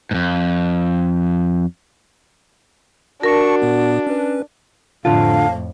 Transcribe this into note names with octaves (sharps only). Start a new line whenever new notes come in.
F2 G#2
D4 F#4 A#4 A5 C#6 C#7
A#2 B3
C#4 B4
F2 A2 D3 F4 F5 A5